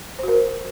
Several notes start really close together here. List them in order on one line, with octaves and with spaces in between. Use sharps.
C5 F#4 A#4